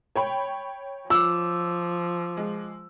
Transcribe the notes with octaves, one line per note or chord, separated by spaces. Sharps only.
C#5 G5 B5
F3 F4 D6 E6
G#3